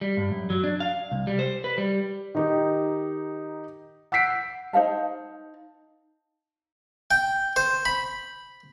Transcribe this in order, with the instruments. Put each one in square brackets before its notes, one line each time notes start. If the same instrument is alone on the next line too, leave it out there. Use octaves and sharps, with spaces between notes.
[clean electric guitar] G3
G2
F#2
F#3
D4
F5
C2
G3
C5
B4
G3
[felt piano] D#3 D#4 G4
F#5 E6 G6 B6 C7 D7
[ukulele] D#4 C5 F5 A5
[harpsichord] G5
C5
B5